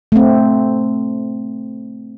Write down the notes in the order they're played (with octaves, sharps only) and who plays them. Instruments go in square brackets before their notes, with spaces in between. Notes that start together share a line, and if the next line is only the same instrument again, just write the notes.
[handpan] A3 C4